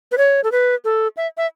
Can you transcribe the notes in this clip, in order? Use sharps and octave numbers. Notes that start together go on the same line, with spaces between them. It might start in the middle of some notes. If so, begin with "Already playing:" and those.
B4
C#5
A4
B4
A4
E5
E5